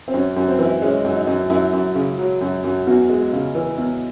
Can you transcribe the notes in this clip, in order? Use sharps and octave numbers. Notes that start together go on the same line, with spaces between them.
C4
F#2 C#4
F#2
C4
E3
E4
G#3 C#4
F#2
D#4
F#2
F#2 E4
F#2
C#3
F#3
F#2
F#2
E2 F#4
G#3
C#3
E3
E2